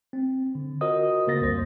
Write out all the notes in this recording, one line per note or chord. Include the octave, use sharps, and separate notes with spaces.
C4
D3
F4 F#4 A#4 C5 D#5 D#6
C#3 A#3 A#4 A6 A#6
C2 F2 C5